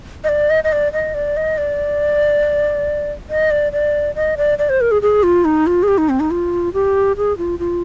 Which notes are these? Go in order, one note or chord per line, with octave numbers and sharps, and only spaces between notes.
D#5
D5
D#5
D#5
D5
D#5
D5
D#5
D5
D#5
D5
D5
D#5
D5
D5
C5
A#4
G#4
G#4
F4
D#4
F4
G#4
G4
D#4
C4
D#4
F4
G4
G#4
F4
F4